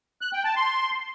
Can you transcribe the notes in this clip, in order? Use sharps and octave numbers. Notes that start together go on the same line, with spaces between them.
F#6
G5
A5
C6